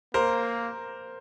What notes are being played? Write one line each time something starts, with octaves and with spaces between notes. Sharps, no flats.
A#3 A#4 C5